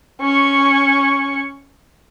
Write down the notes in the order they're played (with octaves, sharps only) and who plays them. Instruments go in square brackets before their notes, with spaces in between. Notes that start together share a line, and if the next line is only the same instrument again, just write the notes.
[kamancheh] C#4 C#6